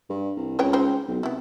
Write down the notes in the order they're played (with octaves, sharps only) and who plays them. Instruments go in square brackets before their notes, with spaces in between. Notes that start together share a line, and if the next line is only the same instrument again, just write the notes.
[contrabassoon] G2
C2
[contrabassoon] C#2 [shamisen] B4 C#5 G5
[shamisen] C4 D#4 C5
[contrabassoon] B1
[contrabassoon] C3 [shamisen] B3 E4